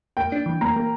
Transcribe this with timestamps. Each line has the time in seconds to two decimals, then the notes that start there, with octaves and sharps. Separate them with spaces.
0.17 A#3 G5
0.32 D4
0.46 E3
0.61 A#3 A#5
0.76 A#3